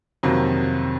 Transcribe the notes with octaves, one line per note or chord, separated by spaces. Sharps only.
F2 C3 D#3 F#3 A#3